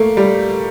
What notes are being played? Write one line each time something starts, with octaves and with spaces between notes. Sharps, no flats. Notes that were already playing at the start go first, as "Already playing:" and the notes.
Already playing: A3 A#3
G3